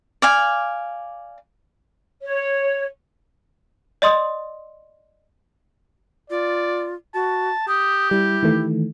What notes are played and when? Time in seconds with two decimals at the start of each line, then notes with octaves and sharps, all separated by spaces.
0.22 D5 F5 G#5
2.21 C#5
4.02 D5 D#5 C6 D#6
6.30 F4 D5
7.14 F#4 A5
7.68 G4 D#6
8.11 G3 E4
8.43 D#3 E3 A3